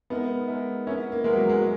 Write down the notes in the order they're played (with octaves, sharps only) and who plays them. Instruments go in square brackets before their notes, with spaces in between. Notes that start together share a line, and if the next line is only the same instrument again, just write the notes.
[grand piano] G#3 D#4 A#4 E5 [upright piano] B3
[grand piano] G#3 D#4 A#4 E5
[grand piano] B3 E4 A#4 E5 [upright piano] C#4
[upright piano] A#3
[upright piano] G#3 [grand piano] B3 E4 A#4 E5
[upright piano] F#3
G#3
[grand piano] G#3